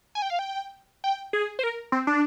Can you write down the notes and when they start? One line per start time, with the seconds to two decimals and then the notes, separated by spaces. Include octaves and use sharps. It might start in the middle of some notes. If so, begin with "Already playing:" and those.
0.15 G#5
0.22 G5
0.30 F5
0.39 G5
1.04 G5
1.33 G#4
1.59 C5
1.63 A#4
1.92 C4
2.07 D4